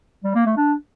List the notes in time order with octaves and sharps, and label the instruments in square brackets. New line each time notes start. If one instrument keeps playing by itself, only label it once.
[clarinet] G3
A#3
A3
D4